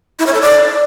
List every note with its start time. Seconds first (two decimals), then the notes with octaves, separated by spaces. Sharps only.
0.19 E4
0.27 C#5
0.34 A4
0.41 D5